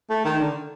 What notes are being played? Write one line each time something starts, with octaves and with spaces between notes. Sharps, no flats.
A3
D#3
D3